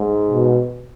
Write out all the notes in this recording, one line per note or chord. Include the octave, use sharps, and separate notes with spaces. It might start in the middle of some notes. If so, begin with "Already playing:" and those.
Already playing: G#2
B2